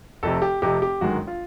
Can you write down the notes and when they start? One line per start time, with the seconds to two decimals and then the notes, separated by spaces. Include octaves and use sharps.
0.23 F1 F2 C3 A4
0.42 G4
0.62 F1 F2 C3 G4
0.82 G4
1.01 G1 F#2 D#3 G#3 F#4
1.27 F4